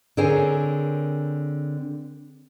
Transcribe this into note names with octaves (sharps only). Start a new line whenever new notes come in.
D3 C4 G#4 A#4 C#5 G#5